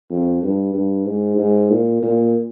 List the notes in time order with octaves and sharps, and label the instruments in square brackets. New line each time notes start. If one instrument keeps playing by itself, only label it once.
[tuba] F2
G2
G2
G#2
G#2
A#2
A#2